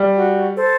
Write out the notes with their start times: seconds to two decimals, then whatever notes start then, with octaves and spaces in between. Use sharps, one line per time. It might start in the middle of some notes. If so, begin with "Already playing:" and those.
Already playing: G3
0.16 F#4
0.54 A4 C5